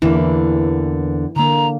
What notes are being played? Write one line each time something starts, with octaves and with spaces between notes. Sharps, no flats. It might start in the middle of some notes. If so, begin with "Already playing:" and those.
E2 D3 E3 A#3 E4
D3 A#3 A#5